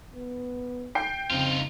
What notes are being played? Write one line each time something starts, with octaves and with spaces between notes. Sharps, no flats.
B3
G5 C7
F2 C#3 C4 D#4 F4